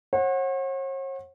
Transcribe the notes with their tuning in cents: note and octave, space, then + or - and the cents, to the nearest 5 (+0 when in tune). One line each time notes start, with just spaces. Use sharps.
C#5 -45 F#5 -10